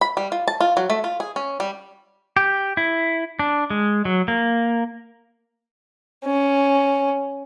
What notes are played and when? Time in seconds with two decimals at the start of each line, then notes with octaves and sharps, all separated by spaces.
0.01 B5
0.17 G3
0.32 F4
0.48 A5
0.61 F4
0.77 F#3
0.90 A3
1.04 F4
1.20 G#4
1.36 C#4
1.60 G3
2.37 G4
2.77 E4
3.39 D4
3.70 G#3
4.05 F#3
4.28 A#3
6.25 C#4